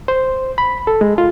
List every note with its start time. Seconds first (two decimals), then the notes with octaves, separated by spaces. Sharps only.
0.08 C5
0.58 B5
0.87 A4
1.01 G#3
1.18 F4